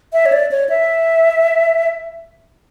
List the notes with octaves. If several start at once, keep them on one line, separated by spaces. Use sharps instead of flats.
E5
C#5
D5
C#5
E5